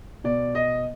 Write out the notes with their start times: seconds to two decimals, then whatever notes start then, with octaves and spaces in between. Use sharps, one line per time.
0.24 B2 D5
0.55 D#5